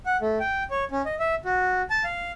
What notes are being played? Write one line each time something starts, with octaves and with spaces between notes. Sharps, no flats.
F#5
A3
G5
C#5
C#4
D#5
E5
F#4
A5
F5